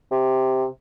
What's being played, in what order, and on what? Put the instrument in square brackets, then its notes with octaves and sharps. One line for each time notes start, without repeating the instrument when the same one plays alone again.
[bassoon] C3